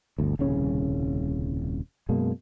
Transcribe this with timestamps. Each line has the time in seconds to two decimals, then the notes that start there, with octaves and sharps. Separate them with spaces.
0.18 G1 D2
0.39 D#1 C2 C#3 C#4
2.09 F#2 B2 G#3 A#3